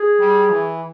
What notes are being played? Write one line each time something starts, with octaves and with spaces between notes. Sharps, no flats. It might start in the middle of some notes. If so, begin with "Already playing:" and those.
Already playing: G#4
G3
E3